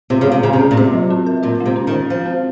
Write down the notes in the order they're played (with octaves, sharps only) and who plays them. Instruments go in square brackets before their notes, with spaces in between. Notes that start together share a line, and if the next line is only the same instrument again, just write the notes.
[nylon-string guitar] C3 [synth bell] F4
[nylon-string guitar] C#3
[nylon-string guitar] C3 [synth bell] G#3
[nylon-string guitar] C#3 [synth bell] C#4
[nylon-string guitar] C3
[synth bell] G#4
[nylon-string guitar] A#2
[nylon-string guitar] C3 [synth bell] F4
[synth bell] F#3
C4
A#4
[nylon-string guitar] A#2 [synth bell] F4
[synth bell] G#3
[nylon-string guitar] C3
[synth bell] C#4
[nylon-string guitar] D#3
[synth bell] C5
[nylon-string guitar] F3 [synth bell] C5
[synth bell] C4